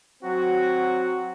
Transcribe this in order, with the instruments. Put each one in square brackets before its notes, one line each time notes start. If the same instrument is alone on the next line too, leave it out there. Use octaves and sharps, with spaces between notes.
[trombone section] F#3 C4 F#4